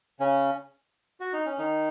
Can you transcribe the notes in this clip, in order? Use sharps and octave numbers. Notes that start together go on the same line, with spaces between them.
C#3 C#4
F#4
D#4
C#4
D#3 D#4